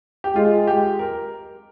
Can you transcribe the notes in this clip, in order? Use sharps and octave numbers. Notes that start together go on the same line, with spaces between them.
G4
G#3 F4
G4
A#4